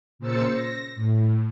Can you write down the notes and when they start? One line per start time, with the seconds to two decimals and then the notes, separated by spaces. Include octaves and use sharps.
0.19 A#2 C#3 C5 E6 A6 C#7
0.52 A#6
0.96 A2